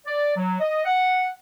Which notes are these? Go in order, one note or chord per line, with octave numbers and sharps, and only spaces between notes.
D5
F#3
D#5
F#5